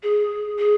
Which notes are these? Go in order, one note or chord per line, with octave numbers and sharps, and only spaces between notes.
G#4
G#4